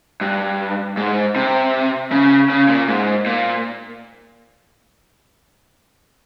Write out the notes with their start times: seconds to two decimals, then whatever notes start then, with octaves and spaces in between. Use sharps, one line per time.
0.21 G2
0.97 G#2
1.36 C3
2.12 C#3
2.50 C#3
2.69 A#2
2.88 G#2
3.26 A#2